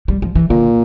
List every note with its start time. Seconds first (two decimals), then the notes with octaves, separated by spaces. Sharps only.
0.08 G3
0.22 F3
0.35 E3
0.50 A#2 D3